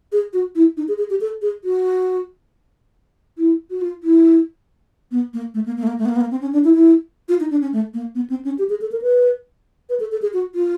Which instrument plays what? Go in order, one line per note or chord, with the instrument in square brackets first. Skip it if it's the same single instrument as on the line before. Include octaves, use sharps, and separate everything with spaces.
[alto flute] G#4
F#4
E4
D#4
G#4
G#4
G4
A4
G#4
F#4
E4
F#4
F4
E4
B3
A#3
A3
A#3
A#3
A3
A#3
A3
B3
A#3
B3
A#3
C4
C#4
D4
E4
E4
F4
D#4
D4
C#4
A3
A#3
B3
C4
C#4
G4
G#4
A4
A#4
B4
B4
A4
A4
G#4
F#4
F4